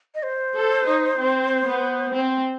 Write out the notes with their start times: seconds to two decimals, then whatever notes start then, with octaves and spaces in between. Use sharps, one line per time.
0.15 D#5
0.23 C5
0.55 A4
0.86 D#4
1.18 C4
1.65 B3
2.11 C4